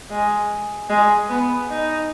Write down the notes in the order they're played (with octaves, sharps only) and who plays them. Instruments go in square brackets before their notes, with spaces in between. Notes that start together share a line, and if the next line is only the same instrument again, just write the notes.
[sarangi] G#3
G#3
B3
D#4